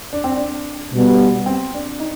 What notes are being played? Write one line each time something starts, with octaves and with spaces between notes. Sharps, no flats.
D4
C4
D4
B2 G3 B3
C4
D4
D#4